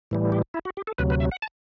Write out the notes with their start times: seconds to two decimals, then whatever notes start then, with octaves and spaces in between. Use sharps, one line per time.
0.11 A2 E3 G3
0.32 G4
0.54 E4
0.65 F#4
0.77 G4
0.87 A4
0.98 D2 C3 F#3 B4
1.10 B4
1.20 E5
1.32 F#5
1.42 A5